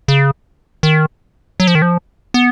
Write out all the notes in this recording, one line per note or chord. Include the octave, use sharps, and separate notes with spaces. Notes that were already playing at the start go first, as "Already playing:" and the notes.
C#3
D#3
F#3
F3
D#3
F3
B3